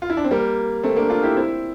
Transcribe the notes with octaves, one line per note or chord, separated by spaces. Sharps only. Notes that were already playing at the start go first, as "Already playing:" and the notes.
F4
E4
D4
C4
G3 A#3
A3 C4
A#3 D4
D4 F4
E4 G4
C4 E4